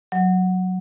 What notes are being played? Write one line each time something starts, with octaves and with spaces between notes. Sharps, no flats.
F#3